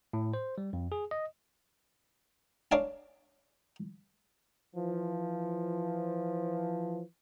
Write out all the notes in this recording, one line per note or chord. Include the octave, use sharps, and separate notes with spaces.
A2
C5
G3
F2
G#4
D#5
D4 C#5 F5 G#5
E3 F3